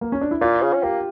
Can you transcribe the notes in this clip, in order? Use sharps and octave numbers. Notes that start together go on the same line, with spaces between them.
A#3
C#4
D4
E4
A#2 F4
C#3
C#4
A#3 G4